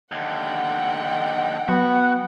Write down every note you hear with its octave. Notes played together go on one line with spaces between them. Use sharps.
D#2 D3 F#5 G5
F#3 B3 F#4